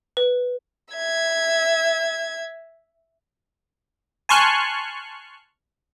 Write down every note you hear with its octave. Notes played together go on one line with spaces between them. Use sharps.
B4
E5 G#6
G#5 A5 C6 C#6 F6 F#6